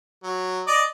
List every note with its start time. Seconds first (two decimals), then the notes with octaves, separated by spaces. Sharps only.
0.23 F#3
0.67 D5 D#5 D6